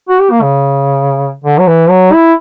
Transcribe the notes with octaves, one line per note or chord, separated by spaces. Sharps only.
F#4
G4
A#3
C#3
D3
F#3
E3
F#3
E4